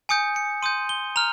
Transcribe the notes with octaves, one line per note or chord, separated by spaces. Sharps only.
G#5 D#6 G6 C#7
C#7
C6 D#6 G6 D#7
G7
A#5 F6 F7